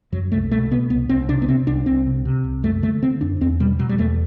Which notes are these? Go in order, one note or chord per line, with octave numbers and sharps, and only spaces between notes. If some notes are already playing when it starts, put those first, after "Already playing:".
F#2 F#3
C2 A3
B2 A3
B2 B3
C2 B3
C2 C4
C3 D4
B3
C3 C4
C2 D4
C2 C4
C3
C3
C2
F#2 A3
D3 A3
D3 C4
F#2 D4
E2 C4
B2 G3
B2 F#3
G3
E2 A3